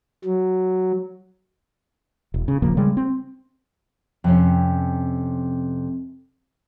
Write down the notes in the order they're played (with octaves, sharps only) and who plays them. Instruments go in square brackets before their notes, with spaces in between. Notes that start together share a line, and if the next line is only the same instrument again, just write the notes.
[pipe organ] F#3
[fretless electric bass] E1
C#3
D#1 C#3 F3 A#3
C#3 G3 G#3
C4
[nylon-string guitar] F2 C3 C#4